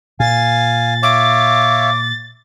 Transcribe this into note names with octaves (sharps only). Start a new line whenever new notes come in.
A#2 F5 G#5 A6
C#5 E5 F5 D6